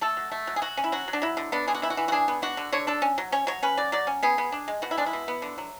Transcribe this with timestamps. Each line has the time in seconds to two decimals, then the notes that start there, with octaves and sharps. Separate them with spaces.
0.01 A3 A4
0.17 F#3
0.32 A3
0.47 F#3
0.56 G#4
0.62 F#3 F#4
0.77 C#4
0.84 E4
0.92 F#3 F#4
1.08 F#3
1.13 D4
1.22 F#3 E4
1.37 D3
1.52 B3 D4
1.68 D3 G#4
1.74 F#4
1.82 E3 E4
1.90 F#4
1.97 E3
2.08 F#4
2.12 D4 G#4
2.28 B3
2.42 D4 F#4
2.57 D3
2.72 D3 C#5
2.87 D4 A4
3.02 C#4
3.18 F#3
3.32 C#4 C#5
3.47 F#3 C#5
3.63 C#4 B4
3.77 F#3 D5
3.92 F#3 D5
4.07 C#4
4.23 B3 G#4
4.38 B3
4.52 D4
4.68 G#3
4.82 B2 F#4
4.91 E4
4.97 G#3 D4
5.06 E4
5.13 B2
5.28 B3
5.42 D3
5.58 F#3